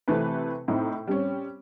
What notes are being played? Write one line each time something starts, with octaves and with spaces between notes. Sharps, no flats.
C3 E3 A3 C4 B4
A2 C4 D#4 E4
G3 C4 C#4